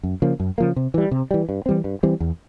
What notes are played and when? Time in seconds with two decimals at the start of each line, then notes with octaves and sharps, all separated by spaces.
0.03 F#2
0.22 C#3 F3 A#3
0.40 F#2
0.58 C#3 F3 A#3
0.76 C3
0.94 E3 G3
1.11 C3
1.31 E3 G3
1.49 G2
1.66 E3 G3 C4
1.84 G2
2.03 E3 G3 C4
2.20 E2